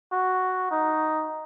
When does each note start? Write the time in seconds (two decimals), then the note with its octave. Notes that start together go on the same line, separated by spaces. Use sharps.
0.12 F#4
0.71 D#4